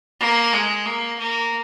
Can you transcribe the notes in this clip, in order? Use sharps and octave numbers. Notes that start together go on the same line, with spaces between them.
A#3
G#3
A#3
A#3